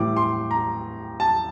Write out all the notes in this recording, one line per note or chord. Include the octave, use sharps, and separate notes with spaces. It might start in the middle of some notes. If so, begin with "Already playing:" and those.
Already playing: A2 E3 G3 D6
C6
A#5
A5